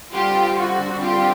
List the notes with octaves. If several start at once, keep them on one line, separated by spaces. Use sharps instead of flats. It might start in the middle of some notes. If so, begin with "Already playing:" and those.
D3 G3 C4 F4 G4
F#4
F4 G4